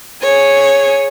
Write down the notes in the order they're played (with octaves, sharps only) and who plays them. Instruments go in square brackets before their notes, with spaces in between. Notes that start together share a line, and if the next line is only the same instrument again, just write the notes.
[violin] G#4 C#5